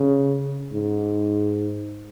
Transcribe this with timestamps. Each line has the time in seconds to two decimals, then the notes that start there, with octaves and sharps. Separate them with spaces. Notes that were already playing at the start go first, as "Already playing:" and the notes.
Already playing: C#3
0.73 G#2